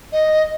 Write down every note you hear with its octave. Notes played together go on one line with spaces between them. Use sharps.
D#5